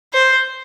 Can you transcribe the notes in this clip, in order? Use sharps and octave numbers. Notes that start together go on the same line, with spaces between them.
C5